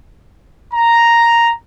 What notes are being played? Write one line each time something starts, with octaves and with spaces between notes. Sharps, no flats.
A#5